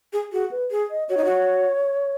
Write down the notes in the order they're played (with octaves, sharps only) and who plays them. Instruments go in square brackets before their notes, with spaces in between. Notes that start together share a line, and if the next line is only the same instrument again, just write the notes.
[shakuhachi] G#4
[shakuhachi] F#4 [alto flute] G#4
[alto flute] B4
[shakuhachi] G#4
[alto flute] D#5
[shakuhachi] F#4 [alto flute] C#5
[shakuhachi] D#4
F#4